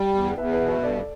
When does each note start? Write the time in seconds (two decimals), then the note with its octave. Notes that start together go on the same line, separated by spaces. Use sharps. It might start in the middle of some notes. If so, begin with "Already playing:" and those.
Already playing: G3 D5 G5
0.15 E2
0.37 E2 B4 E5
0.53 B4 E5
0.60 B2
0.68 B4 E5
0.83 G2 A4 D5